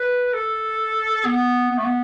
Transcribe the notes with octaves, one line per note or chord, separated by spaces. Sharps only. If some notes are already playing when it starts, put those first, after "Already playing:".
Already playing: B4
A4
B3
B3
A3
B3